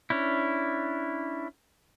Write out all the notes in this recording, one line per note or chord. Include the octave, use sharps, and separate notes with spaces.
C#4 D4 E4